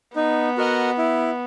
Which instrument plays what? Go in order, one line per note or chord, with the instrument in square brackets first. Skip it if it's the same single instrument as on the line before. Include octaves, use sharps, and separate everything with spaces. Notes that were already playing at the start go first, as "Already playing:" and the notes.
[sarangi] B3 [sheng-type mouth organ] D#4
[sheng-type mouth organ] F#4 A#4 D#5 F#5
E4